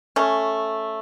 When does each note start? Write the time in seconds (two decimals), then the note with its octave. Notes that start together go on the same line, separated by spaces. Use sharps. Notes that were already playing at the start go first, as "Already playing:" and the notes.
0.16 A3 C#4